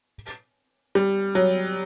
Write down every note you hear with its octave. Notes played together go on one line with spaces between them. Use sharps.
G3
F#3